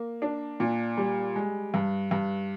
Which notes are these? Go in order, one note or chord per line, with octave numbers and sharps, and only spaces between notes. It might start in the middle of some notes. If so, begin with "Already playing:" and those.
Already playing: A#3
D4
A#2
G3
G#3
G2
G2